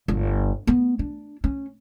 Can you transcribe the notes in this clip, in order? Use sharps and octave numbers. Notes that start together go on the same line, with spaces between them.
G1
B3
D4
C#4